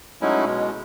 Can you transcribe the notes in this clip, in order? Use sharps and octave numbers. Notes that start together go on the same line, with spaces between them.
F#3 G#3 A3 C#4 D#4 E4
B2 G#3